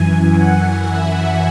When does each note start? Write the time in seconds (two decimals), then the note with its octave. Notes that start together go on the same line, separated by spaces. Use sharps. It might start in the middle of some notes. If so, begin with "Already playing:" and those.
Already playing: F#2 E3 G#5
0.34 F#5
0.89 E5